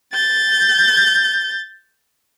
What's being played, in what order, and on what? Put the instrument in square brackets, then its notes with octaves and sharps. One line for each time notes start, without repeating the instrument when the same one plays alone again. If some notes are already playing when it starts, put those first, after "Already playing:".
[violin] G6 A6